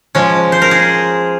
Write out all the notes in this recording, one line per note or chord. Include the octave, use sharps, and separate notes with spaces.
F3 G#3 C#4
C5
A#4
G#4